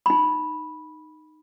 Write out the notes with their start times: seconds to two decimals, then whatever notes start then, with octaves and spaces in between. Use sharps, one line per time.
0.06 D#4 B5